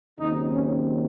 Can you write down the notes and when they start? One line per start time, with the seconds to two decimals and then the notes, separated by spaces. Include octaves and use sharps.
0.19 D#2 C#3 F#3 C4 D#4
0.51 C#4